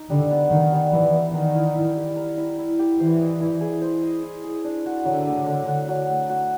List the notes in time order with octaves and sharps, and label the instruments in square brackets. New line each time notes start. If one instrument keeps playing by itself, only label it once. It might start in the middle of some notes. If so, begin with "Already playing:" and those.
Already playing: [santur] D#4
[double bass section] D3 [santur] G3
[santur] B3
[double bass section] D#3 [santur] D#4
[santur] G3
[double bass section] E3 [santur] G3
[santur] B3
[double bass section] D#3 [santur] A#4
[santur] E4
E4
G4
A#4
E4
E4
G4
[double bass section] E3 [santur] C5
[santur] D#5
E4
G#4
C5
D#5
E4
G#4
D4
F#4
[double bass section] D3 [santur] F#3
[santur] A3
D4
F#4
F#3
A3
F#4